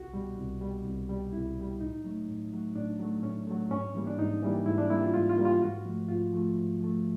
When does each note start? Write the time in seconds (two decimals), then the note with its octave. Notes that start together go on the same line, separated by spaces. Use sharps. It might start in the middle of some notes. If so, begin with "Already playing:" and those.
Already playing: C2 F#4
0.14 B2 G3
0.38 C2
0.61 B2 G3
0.85 C2
1.09 B2 G3
1.33 C2 E4
1.57 B2 G3
1.80 A2 D#4
2.04 F#3 A3
2.28 A2
2.52 F#3 A3
2.76 A2 D4
2.99 F#3 A3
3.23 A2 C#4
3.47 F#3 A3
3.71 G#2 C#4
3.94 E3 G3 A#3
4.07 D4
4.18 G#2 D#4
4.42 E3 G3 A#3
4.66 G#2 E4
4.78 D4
4.90 E3 G3 A#3 E4
5.02 F4
5.13 G#2 F4
5.30 F4
5.38 E3 G3 A#3
5.45 F4
5.61 G#2 F#4
5.85 F3 A3
6.09 G#2 F4
6.33 F3 A3
6.56 G#2
6.81 F3 A3